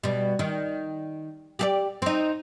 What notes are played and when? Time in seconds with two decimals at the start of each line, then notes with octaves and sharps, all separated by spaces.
0.03 B2 G3
0.39 D#3
1.59 G4 G#4 D5
2.02 C4 D#4